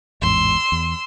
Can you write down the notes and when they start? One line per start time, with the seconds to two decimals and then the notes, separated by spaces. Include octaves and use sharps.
0.22 A1 E2 G#2 C6 E6
0.72 E2